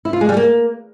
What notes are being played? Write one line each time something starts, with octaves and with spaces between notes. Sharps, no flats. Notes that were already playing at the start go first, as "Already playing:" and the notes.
E4
F4
G#3
G3
A#3